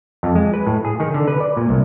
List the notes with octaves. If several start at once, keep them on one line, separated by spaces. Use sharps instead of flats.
F2
G#3
B4
A2
G#4
D#3
D3
B4
D5
A#2
C2